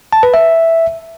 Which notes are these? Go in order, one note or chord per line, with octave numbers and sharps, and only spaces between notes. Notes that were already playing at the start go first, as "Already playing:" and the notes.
A5
B4
E5